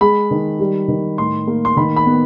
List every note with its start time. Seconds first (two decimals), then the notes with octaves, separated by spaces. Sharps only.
0.01 G#3 B5
0.31 D#3
0.59 G3
0.88 D#3
1.18 A2 C6
1.47 A#3
1.65 C6
1.77 D#3 B5
1.96 B5
2.06 B3